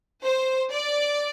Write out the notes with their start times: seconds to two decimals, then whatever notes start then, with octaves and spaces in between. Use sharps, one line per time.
0.23 C5
0.71 D5